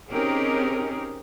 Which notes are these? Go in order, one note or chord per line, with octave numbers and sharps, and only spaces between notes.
C4 C#4 D#4 G4 G#4 A#4